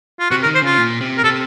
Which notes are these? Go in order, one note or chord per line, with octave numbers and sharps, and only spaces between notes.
F4
C3 F#4
A#4
D#3
C5
C#3 F4
A#2
C3
A#4
C3 A4